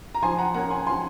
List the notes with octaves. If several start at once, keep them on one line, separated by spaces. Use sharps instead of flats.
A#5
F3 G#5 C6
F#5 A#5
A#3 C#4 F#5 A#5
G#5 C6
F3 G#5 C6